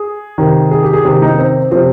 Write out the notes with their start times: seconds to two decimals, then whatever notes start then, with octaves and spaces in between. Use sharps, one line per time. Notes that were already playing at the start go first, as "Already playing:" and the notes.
Already playing: G#4
0.38 C3 D#3
0.71 G#4
0.83 G4
0.93 G#4
1.05 C3 D#3 G4
1.22 D#4
1.38 C4
1.71 C3 F3 C4